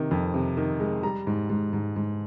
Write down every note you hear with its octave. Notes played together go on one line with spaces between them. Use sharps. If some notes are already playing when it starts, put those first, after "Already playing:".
Already playing: C3 D#3
F2
C3
D#3
G#3
G3 A#5
G#2
G#2
G#2
G#2